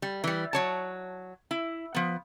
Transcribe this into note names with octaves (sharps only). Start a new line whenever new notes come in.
G3
E3 G3
F#3 C#5 A5
E4
F3 B3